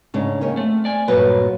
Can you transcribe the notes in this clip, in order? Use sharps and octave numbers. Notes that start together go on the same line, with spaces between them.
G#2 C#3 D4
D#3 A#3 C#4
A3 C4
D5 G#5
G2 A#2 F#3 A#3 B4